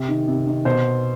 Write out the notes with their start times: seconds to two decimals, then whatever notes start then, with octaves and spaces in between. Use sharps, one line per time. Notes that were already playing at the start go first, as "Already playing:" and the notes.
Already playing: C3
0.09 D#3
0.28 C3
0.47 D#3
0.65 B2 C5